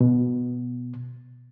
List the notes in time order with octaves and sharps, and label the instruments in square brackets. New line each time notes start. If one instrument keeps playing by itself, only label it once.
[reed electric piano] B2